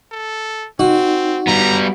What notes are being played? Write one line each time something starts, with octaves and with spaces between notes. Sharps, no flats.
A4
C4 D#4 F#4
G3 B3 A#5